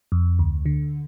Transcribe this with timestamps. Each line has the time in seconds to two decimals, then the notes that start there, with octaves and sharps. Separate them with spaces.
0.12 F2
0.39 D2
0.66 D3